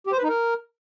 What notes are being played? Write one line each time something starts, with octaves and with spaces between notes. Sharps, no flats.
G4
C5
B4
D#4
A#4